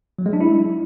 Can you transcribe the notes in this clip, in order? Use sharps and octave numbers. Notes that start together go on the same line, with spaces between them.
F#3
G#3
D4
E4